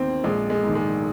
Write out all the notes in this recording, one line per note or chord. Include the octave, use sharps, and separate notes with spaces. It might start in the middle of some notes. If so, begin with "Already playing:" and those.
Already playing: D#2 D#3 C4
A#1 G#3
G#3
G#2 D#3
G#3